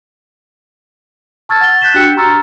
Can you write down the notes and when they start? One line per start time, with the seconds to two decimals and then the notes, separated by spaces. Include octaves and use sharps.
1.49 A5 C#6 E6 F6 G#6 A6
1.61 F#5 A6 G7
1.81 F#6 G6 A6 B6 E7 G7
1.94 D4 F#4 G4 G5 E6 C#7
2.17 A#5 C6 C#6 E6 F6 A6